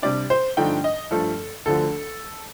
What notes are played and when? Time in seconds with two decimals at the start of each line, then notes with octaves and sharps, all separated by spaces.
0.02 C3 G3 D4 D5
0.30 C5
0.57 G2 D3 F3 A3 D#4 G5
0.84 D#5
1.11 G2 F3 A3 A4
1.66 D2 D3 F3 A4